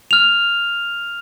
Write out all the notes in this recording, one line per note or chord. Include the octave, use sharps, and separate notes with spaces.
F6 F7